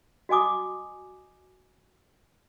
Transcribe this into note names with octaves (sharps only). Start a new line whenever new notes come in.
F#4 D#5 G#5 D6 D#6